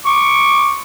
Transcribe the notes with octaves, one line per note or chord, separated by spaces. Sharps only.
C#6 D6